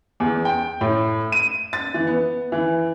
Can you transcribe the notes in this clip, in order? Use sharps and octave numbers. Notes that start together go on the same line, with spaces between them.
E2
G5
A2
D#7
A6
E3
B3
E3